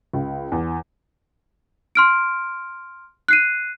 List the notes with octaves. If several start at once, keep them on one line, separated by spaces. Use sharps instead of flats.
C#2
E2
C6 F6 D7
F#6 C7 D#7